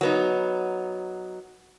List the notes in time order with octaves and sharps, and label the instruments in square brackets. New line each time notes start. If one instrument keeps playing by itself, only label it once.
[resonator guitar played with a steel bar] F#3 B3 D#4